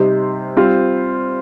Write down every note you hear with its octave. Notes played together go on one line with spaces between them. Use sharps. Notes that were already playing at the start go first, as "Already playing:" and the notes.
Already playing: C3 G3 D#4 C5
G3 C4 F4 C5